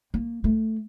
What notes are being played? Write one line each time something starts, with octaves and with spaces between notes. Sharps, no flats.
A#3
A3